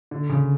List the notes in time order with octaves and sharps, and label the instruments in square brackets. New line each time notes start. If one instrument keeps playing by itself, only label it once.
[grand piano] D3
C#3